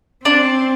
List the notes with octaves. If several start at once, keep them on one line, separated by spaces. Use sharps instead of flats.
C4 D4